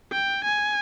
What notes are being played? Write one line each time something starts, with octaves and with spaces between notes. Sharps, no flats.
G5
G#5